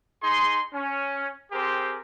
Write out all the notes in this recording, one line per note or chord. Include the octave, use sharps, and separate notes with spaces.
D#4 G#4 C6
C#4
C4 G4 G#4 A#4 C5